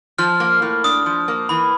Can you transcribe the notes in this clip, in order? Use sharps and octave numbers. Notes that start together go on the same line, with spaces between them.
F3 F6
A#3
A2
D4 D#6
F3
A#3
E3 B5